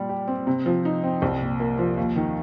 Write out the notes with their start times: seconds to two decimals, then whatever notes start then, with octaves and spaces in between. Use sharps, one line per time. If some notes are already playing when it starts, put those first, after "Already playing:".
Already playing: A#2 G3
0.09 G4
0.28 C4
0.47 C3
0.66 F3
0.85 D#4
1.04 C4
1.22 C2
1.41 A#2
1.60 A#3
1.79 F3
1.97 D#2
2.16 D#3